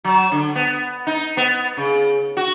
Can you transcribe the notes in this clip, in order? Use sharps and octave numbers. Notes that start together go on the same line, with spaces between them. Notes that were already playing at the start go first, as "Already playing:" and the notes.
F#3
D3
B3
D#4
B3
C#3
F#4